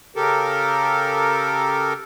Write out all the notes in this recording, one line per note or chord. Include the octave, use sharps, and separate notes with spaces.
C#3 G4 A4 A#4